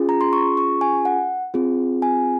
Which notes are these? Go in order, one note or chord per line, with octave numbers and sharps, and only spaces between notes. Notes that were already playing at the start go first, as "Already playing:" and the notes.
Already playing: C#4 F4 G#4
A#5
C6
C#6
C#6
G#5
F#5
C4 F4 G#4
G#5